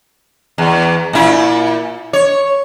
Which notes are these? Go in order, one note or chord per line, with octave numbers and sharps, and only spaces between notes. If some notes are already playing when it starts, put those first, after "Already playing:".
E2
A#2 E4
C#5